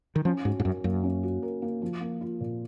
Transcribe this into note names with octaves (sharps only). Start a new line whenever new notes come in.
D#3
F3 C#4
G#2 F#4
G#2
F#2 A#4
F#2 A#3
C#4
F#4
A#4
A#3
F3
A#3
F4
A#2